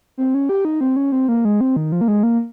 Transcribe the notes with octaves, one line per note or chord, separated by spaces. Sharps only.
C4
C#4
G4
D#4
C4
C#4
C4
A#3
G#3
C4
D#3
F3
A#3
G#3
A#3